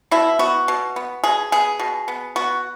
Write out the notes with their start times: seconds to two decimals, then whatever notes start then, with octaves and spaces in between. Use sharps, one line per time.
0.11 B2 E4
0.39 B3 F#4
0.68 B2
0.96 B3
1.24 B2 G#4
1.52 B3 G#4
1.79 B2
2.08 B3
2.36 B3 F#4